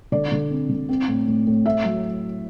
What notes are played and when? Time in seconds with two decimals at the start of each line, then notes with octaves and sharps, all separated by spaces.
0.12 D3 D5
0.32 D3
0.50 C4
0.69 D3
0.89 C4
1.08 A2
1.27 A2
1.47 A2
1.65 A3 E5
1.84 F#3